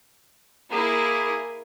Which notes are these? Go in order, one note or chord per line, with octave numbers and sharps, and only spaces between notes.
A#3 E4 G#4